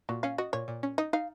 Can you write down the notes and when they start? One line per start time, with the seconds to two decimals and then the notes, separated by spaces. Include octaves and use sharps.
0.09 A#2 F#4
0.23 C#4 F5
0.38 F#4 D#5
0.53 A#2 C#5
0.68 A#2
0.83 C#4
0.98 D#4 D#5
1.13 D#4 F5